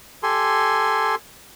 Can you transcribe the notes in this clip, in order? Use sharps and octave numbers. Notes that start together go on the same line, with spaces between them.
G4 A4 G#5 C6